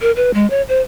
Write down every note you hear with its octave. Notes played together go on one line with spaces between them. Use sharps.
A#4
B4
G#3
C#5
C5